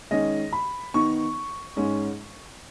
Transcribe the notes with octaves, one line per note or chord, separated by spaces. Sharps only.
D#3 G#3 C#4 D#5
B5
D#3 B3 D#4 C#6
G#2 G#3 C#4